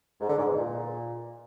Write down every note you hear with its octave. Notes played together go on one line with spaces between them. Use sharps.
G#2
D3
G#2
E2
A#2